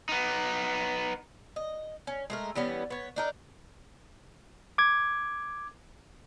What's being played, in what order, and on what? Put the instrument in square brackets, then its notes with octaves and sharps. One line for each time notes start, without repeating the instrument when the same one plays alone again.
[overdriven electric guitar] B3 D#4
[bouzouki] D#5
C#4
G#3 A3 A#4
E3 G3 B3 C#4
B3 C#5
D4 D#4 A#4
[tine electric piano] D6 G#6